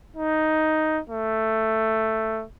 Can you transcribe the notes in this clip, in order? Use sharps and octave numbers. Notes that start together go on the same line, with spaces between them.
D#4
A3